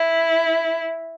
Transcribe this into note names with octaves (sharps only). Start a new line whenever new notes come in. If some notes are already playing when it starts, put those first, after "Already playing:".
Already playing: E4